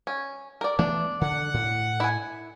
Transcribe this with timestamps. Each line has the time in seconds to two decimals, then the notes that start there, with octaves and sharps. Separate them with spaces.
0.07 C#4
0.61 A#4 D5
0.79 E3 A3 B3 D4
1.21 D3 F#5
1.54 A2
2.00 E4 G#5